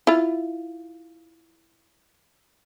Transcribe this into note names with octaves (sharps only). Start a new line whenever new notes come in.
E4 F4